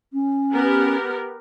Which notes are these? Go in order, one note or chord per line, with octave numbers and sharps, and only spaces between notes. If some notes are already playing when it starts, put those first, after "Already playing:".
C#4
B3 G4 A#4